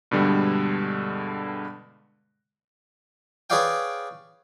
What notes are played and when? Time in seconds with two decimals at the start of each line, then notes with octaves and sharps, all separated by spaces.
0.11 G2 B2 D3 G3 G#3
3.50 G#4 B4 C#5 D5 F5 G5